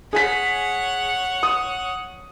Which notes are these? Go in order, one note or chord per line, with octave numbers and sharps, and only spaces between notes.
G#4 C#5 F#5 G#5 B6
D#6